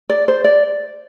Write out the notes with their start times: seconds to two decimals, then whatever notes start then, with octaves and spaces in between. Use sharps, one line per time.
0.10 D5
0.28 C5
0.44 D5